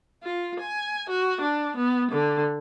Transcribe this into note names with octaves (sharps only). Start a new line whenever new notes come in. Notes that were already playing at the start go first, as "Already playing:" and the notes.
F4
G#5
F#4
D4
B3
D3